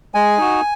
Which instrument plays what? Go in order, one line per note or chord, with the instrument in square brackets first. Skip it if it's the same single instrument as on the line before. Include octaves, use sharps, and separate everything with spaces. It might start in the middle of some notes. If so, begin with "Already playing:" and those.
[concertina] G#3 G#5
D#4 F#4